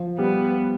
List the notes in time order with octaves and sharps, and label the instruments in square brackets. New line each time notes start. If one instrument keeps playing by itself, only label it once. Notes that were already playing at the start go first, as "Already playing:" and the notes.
Already playing: [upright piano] F3
[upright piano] G3 [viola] B3